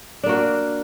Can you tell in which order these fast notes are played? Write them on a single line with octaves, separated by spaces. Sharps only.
D4 A#3 F#4